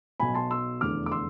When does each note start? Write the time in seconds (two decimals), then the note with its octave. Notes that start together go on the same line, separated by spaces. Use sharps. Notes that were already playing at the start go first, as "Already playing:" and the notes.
0.20 B1 B2 G#5 B5
0.34 A5 C6
0.51 C6 E6
0.81 F1 E2 D3 D6 F6
1.06 D6
1.11 C6 E6